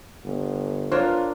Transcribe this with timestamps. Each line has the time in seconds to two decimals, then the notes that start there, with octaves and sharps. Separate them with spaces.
0.24 G1
0.92 B3 D4 F4 A#4 C5 C#5